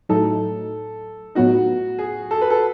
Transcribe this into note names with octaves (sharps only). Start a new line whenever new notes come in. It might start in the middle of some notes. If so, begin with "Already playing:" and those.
A2 F#3 A3 D#4 A4
A2 F#3 B3 D#4 F#4
G#4
A4
B4
A4